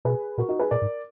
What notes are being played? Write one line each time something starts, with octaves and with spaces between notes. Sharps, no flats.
B2 G#4 B4
A#2 F#4 A#4
D#4 F#4
G#4 B4
A#2 A#4 D5
G#2